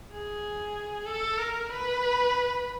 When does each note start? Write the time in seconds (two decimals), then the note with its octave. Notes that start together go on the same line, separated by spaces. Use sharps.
0.11 G#4
1.06 A4
1.37 A#4
1.69 B4